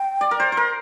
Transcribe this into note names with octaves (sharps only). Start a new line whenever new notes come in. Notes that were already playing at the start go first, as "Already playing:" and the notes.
Already playing: G5
D5
A#4
C5
C5
A#4